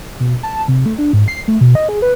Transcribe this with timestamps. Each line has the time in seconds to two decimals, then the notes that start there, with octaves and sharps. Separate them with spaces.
0.20 B2
0.43 A5
0.68 C3
0.86 A3
0.98 D4
1.13 G#2
1.28 C7
1.48 A3
1.61 B2
1.75 D#5
1.89 G#4
2.02 B4